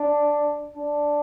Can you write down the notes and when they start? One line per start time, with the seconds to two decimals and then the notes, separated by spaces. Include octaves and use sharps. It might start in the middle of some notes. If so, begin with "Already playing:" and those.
Already playing: D4
0.77 D4